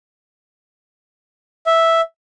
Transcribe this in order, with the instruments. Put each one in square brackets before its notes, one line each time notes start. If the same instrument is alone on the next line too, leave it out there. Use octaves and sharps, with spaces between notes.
[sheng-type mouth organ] E5